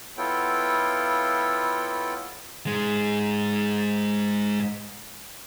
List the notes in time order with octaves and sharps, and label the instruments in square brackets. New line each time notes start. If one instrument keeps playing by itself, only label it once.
[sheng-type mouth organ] B3 E4 F4 A4 C#5 G5
[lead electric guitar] G#2 G#3